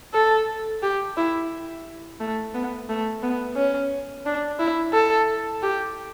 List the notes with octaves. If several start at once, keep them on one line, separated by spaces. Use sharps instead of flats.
A4
G4
E4
A3
B3
A3
B3
C#4
D4
E4
A4
G4